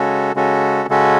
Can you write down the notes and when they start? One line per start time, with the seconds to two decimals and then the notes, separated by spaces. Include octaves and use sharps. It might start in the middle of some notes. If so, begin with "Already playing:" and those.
Already playing: C#3 G#3 C#4 F#4 A4
0.35 C#3 G#3 C#4 F#4 A4
0.89 C#3 G#3 C#4 F#4 A4